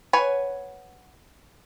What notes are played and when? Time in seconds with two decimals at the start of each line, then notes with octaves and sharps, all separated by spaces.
0.13 B4 C#5 F#5 G#5